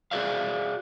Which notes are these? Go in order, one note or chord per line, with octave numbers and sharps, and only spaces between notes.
F#4 G#4 C5 D5 E5 F5